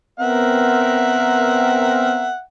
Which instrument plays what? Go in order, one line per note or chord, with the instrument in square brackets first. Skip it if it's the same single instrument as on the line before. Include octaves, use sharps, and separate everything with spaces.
[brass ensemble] B3 C4 A#4 [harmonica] E5 F#5